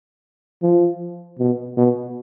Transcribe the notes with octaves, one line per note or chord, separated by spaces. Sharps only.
F3
B2
B2